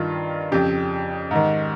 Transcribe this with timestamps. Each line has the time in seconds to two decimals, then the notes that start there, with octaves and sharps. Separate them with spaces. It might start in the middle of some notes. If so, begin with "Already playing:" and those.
Already playing: G2 D#3 F4
0.52 F2 C#3 G4
1.31 G#2 D#3